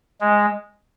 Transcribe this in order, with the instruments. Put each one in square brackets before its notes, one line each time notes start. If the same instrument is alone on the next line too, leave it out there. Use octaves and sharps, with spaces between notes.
[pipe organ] G#3